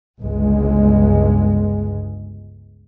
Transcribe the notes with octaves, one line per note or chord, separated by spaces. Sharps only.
G1 C#2 G#3